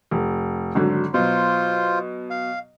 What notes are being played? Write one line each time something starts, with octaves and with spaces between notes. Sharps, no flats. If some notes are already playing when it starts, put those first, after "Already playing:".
F1
G#1 D3 F#3
B2 F#3 F4 C5
F5